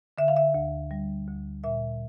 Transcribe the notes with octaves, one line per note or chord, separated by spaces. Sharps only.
D3 E5
F5
E5
D2
G3
D2
A#2 E5